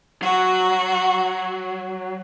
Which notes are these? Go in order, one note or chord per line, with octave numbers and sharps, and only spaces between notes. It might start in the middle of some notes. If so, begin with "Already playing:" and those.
F#3 F#4